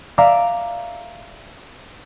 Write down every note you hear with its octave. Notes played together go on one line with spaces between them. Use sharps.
D5 E5 F5 A#5 D6